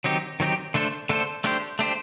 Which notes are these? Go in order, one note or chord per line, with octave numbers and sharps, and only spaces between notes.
D#3 F#3 C4 D#4 G4
D#3 F#3 C4 D#4 G4
D3 A3 D4 A4 C5
D3 A3 D4 A4 C5
A3 D4 G4 C5
A3 D4 G4 C5